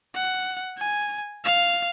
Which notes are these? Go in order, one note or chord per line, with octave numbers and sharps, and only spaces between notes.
F#5
G#5
F5